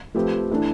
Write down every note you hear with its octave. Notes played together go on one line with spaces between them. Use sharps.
F3 A3 C4 G4 B4
E3 A3 D4